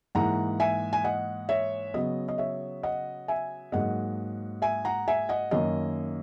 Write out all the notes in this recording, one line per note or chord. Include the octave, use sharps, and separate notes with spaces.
G#2 E3 A#3 F#5 A#5
E5 G#5
G#5
D#5 F#5
C#5 E5
C#3 F#3 B3 D#5
D#5
C#5 E5
D#5 F#5
E5 G#5
G#2 F#3 A#3 D#5 F#5
E5 G#5
F#5 A#5
E5 G#5
D#5 F#5
F#2 D#3 A#3 D#5